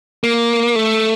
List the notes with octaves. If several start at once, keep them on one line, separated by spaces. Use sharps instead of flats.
A#3
A3